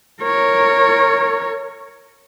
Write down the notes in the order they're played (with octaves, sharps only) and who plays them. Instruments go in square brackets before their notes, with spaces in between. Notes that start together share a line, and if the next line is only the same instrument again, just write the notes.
[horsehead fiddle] A#4 C#5